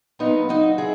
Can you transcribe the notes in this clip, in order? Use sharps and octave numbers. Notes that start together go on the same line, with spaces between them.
A#2 F#3 B3 D#4
D#4 F#4
E4 G#4